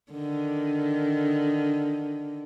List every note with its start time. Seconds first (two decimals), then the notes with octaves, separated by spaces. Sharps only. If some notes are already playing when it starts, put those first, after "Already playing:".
0.12 D3 D#3